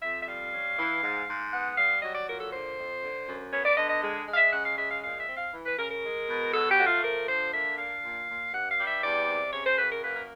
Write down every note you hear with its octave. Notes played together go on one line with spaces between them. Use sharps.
F2 E5
E5
G3 F5
C#4
E3
G#2
G#2
B3 F#5
G3 F5
F#3 D#5
D5
A#2 A#4
A4
D3 C5
F2
D3
F#2
B3 C#5
D5
D3 D#5
D#5
G#3
G#3 F5
E5
C#3 F#5
F5
G#3 E5
F5
A#2 F5
E5
C4
F5
E3
B4
C#3 A#4
A#4
G#3
B2
F#3 A4
G4
A3 F#4
F4
F3 A#4
D3 C5
A#3 E5
D4 F5
A#2
A#2
G2 F#5
F5
G3
E5
E2 D5
C3
C#3 C#5
C5
F#2 B4
A#4
A#3 B4
A#4